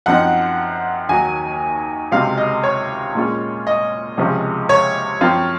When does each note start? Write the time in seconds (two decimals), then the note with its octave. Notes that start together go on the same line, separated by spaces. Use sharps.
0.06 F#2 F3 C4 D#4 F#5
1.09 D#2 D#3 F#3 G#5
2.12 C#2 C3 F#3 C4 D#4 F5
2.38 D#5
2.63 C#5
3.15 A#2 G#3 C#4 F4
3.67 D#5
4.17 C#2 C3 F3 G#3 C#4
4.69 C#5
5.21 F#2 F3 C4 F4